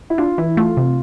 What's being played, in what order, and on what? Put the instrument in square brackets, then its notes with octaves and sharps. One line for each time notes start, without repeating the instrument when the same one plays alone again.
[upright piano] E4
[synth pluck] D4 [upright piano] F4
[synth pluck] E3 [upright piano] E4
[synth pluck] A3 [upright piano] F4
[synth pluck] C3